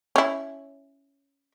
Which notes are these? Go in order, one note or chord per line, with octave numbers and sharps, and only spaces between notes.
C#4 E4